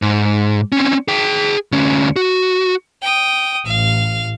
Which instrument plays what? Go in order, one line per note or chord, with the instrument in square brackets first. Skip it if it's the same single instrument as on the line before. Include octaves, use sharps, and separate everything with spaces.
[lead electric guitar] G#2
C4 C#4
G#4 G5
D2 C#4
F#4
[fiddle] G5 D#6
[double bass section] A1 [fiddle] F5